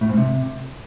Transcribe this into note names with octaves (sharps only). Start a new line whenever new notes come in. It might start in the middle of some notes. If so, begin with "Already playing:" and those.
A2
G#2
C3